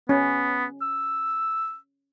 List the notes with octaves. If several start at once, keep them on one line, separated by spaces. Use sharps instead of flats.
B3 C#4
E6